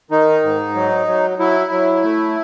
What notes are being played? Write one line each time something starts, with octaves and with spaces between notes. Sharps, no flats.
D#3 D#4
G#2
F#3
F#3
F#3 E4
F#3
A3